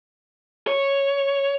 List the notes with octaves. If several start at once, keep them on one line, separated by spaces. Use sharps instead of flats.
C#5